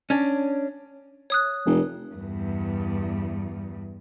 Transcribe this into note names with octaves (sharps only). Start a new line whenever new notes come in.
C#4 D4
C#5 D#6 F#6
F1
E2 G2